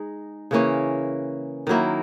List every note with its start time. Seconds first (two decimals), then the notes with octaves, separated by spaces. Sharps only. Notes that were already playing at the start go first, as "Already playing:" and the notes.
Already playing: G#3 D#4 G#4
0.51 C#3 E3 A#3 C#4
1.67 D#3 F#3 A#3 E4